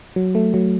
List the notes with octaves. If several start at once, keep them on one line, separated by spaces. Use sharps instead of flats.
F#3
A3
F#3